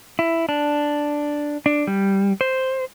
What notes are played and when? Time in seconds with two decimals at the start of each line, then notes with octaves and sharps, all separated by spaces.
0.19 E4
0.49 D4
1.66 D4
1.87 G3
2.41 C5